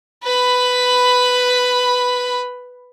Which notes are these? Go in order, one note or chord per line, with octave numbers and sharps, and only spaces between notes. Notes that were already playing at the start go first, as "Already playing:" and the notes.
B4 B5